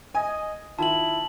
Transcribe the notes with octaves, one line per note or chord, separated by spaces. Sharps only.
D#5 G#5
D#3 E4 F4 A5 F#7